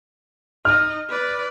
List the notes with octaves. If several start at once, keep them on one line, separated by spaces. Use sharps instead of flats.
D#4 D#5 F6
B4 D5